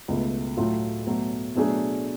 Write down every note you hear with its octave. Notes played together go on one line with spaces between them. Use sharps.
C#2 B2 A3
A2 F#3 A3 F4
B2 F#3 A3
B2 F#3 A3 D4 G#4